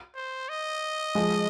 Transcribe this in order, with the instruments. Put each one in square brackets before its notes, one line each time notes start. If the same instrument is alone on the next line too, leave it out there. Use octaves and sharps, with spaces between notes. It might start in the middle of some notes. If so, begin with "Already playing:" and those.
[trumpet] C5
D#5
[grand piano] F3 G#3